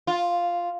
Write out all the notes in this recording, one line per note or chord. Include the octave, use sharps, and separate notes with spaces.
F4